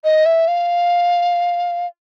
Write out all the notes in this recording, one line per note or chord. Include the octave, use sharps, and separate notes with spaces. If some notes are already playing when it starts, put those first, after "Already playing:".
D#5
E5
F5